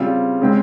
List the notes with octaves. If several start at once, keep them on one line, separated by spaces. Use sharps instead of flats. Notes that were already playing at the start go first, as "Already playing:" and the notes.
Already playing: C#3 G3 C4 F4
C#3 G#3 C4